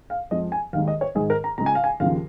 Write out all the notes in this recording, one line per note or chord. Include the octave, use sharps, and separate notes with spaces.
F5
F2 F3 G#3 D#5
G#5
D#2 D#3 G#3 F5
D#5
C#5
G#2 D#3 G#3 G#4
A#4
A#5
C#2 C#3 G#3 A#5
G#5
F5
G#5
D#2 C#3 F3 F5